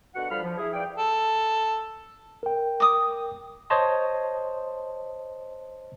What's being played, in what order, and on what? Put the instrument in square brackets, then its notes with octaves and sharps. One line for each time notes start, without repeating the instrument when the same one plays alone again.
[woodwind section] B2 D3 F#4 F#5
D3 F3 G3 F5 B5 F6
F3
E4 G#4
E3 D5 F5 G5
[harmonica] A4
[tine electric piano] A#4 G5
[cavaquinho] D6 D#6
[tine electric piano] C5 C#5 D#5 A5 C6